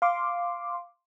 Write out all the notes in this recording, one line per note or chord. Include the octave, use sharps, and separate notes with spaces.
F5 C6 D6